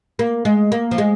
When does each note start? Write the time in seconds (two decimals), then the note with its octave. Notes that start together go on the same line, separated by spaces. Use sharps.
0.19 A#3
0.45 G#3
0.72 A#3
0.91 F3
0.98 G#3